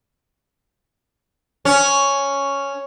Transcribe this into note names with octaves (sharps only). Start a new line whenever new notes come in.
C#4